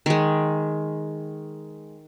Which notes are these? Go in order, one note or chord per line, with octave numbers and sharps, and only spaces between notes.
D#3 G#3